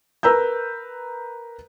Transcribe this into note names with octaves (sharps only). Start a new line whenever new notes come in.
A#4 B4 A#5 E6 G6